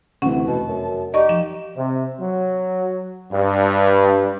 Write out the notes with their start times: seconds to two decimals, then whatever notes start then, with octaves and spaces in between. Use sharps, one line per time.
0.22 D2 C3 E3 C#4 F#5
0.47 F1 B2 A5
0.68 F#2
1.14 D#4 G4 D5 D#5 C#6
1.29 F3 E7
1.77 C3
2.21 F#3
3.33 G2